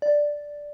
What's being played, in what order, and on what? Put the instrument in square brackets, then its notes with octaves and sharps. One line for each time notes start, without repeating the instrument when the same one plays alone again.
[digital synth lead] D5